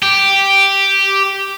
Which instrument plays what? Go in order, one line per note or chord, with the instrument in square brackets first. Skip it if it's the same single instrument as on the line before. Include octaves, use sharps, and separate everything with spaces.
[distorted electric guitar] G4